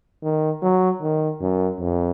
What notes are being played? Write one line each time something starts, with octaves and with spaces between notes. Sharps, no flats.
D#3
F#3
D#3
F#2
F2